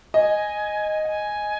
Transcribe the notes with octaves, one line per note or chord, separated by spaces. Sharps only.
D#5 G#5
F#5
G#5